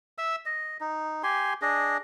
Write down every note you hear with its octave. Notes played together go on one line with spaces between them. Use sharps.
E5 E6
D#5
D#4
G4 G#5 C6
D4 G#4 D#5